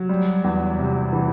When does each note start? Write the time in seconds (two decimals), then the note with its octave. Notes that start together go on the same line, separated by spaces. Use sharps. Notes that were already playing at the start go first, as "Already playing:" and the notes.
Already playing: F#3
0.09 G3
0.44 E2
0.79 C3
1.13 E3